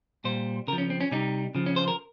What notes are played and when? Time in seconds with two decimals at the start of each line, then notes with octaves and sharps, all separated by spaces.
0.24 A#2 G3 C5
0.67 C#3 A#4
0.73 F3
0.78 C#4
0.90 C4
1.01 C#4
1.11 C3 G3 D#4
1.55 C#3 F3
1.66 C#4
1.76 C5
1.88 A#4